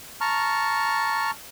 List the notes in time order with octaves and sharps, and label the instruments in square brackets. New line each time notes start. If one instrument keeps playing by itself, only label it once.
[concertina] A5 A#5 C#6 F6